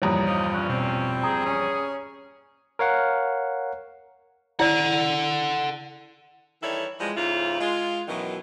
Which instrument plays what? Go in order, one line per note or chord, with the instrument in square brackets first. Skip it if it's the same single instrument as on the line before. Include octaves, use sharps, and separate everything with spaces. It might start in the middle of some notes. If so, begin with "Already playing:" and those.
[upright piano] A#1 E2 G2 [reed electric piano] C#5 A#5 D#6
[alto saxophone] F3 [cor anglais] D#4
[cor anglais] C#4 [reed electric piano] F#6
[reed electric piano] B2 [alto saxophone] C4
[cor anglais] G#4 [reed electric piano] A#5 D#6
[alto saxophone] C#4
[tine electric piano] A#4 C#5 F5 F#5
[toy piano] E4 D5 [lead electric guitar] A4 F#5
[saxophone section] D#3 E3 G3 E4 A4 C#5
E3 F3 G3 G#3
F2 G#2 C#3 E4 F4
G#3 F4
F#2 B2 D#3 E3 F#3